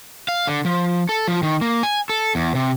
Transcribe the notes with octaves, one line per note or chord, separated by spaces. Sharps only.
F5
D3
F3
A4
F3
D#3
A#3
G#5
A4
E2
C3